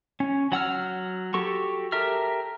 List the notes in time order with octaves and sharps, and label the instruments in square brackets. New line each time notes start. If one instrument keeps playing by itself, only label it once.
[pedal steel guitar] C#4
F#3 F#5 E6 F6
F#4 G4 A4 C#6
G4 A4 A#4 E5 F6